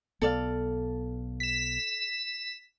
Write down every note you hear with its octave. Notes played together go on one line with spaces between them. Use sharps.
B1 B3 A4 D5 F5
B6 E7